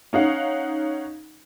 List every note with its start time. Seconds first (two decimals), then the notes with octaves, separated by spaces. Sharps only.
0.13 C#4 D#4 F5 F#5